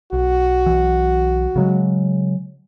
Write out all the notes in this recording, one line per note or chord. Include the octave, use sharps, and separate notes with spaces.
B1 F#4
B1 E3
C#3 F#3 G#3